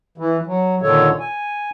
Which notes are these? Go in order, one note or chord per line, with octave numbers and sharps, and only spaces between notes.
E3
F#3
A#2 D3 D#3 A4 C#5
G#5